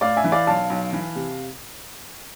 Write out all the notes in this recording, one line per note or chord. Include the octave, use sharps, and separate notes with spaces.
A2 D5 F5
E5 G#5
E3
D5 F5
B1 F5 A5
B1
E3
C3